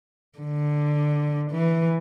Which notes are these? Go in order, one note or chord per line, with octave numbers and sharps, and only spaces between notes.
D3
E3